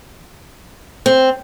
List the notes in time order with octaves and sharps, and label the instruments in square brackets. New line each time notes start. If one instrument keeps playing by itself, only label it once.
[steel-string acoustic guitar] C4